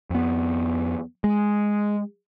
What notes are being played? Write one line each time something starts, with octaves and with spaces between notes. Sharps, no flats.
F2 B3
G#3